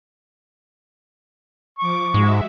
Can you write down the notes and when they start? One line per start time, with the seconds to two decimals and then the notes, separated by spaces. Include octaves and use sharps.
1.79 F3 C#6 D6
2.14 G#2 G#3 F#4 E5